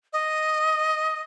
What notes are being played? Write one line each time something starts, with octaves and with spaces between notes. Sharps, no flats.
D#5